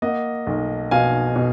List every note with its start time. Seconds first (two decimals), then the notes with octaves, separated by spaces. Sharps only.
0.02 A#3 D#5 F#5
0.47 B1
0.91 B2 F5 G#5
1.36 B2